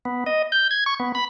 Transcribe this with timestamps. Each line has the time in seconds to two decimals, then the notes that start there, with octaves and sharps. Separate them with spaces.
0.05 B3
0.26 D#5
0.52 G6
0.71 G#6
0.86 C#6
1.00 B3
1.15 B5